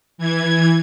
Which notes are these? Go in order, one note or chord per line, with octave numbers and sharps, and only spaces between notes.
E3 G#6